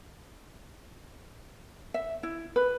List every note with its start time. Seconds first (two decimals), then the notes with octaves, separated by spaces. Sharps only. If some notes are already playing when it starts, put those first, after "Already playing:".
1.94 E5
2.23 E4
2.56 B4